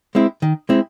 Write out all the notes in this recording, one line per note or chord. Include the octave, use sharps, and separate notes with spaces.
G#3 C4 E4
D#3
G#3 C4 E4